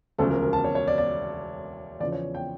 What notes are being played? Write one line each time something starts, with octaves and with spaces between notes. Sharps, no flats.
E1 D2 C#3 F3 C#4 A4
A#4
A#4
A5
C#5
C#5
D5
D5
E2 C#3 F3 D5
C#5
G5